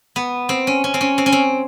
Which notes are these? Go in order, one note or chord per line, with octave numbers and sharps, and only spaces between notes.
B3
C4
C#4
C#4
C4
C#4
C4
C#4
C4